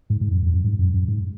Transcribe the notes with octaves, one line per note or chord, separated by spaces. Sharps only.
G#2
G#2
F#2
F2
F#2
G#2
F#2
F#2
G#2